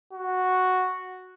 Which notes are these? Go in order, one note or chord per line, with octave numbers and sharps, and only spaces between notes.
F#4